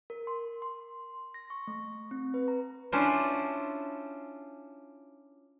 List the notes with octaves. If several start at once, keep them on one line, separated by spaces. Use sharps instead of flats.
A#4
C6
C6
A#6
C#6
A3
C4
B4
A#5
C#4 D4 E4 F4 C5